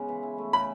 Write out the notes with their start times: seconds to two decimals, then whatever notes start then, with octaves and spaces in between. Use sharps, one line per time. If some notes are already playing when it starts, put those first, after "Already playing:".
Already playing: C#3 G#3 B3
0.08 E3
0.23 E4
0.38 A3
0.53 C#3 B5